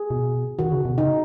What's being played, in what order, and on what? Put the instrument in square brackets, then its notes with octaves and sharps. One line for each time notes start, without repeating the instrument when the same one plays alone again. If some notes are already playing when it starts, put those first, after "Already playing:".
Already playing: [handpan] G#4
[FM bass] B2
[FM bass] D#3 [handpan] F#4
[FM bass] C#3
B2
[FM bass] C#3 [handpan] D#4